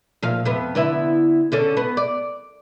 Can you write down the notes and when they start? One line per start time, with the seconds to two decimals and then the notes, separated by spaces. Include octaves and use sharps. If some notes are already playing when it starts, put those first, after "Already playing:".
0.22 A#2 F3 F5
0.45 F2 C3 B3
0.75 D3 B3 E4
1.52 D3 C#4 A4
1.77 B3
1.97 D5